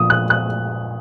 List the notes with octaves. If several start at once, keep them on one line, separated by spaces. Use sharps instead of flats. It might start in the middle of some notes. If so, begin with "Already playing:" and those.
Already playing: A#2 F3 D#6
F#6
F#6